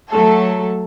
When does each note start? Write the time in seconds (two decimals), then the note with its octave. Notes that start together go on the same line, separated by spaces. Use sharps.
0.12 F#3 A3 A4